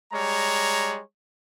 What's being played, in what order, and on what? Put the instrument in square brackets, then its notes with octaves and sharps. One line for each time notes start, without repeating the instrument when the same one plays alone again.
[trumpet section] G3 G#3 C#5 A#5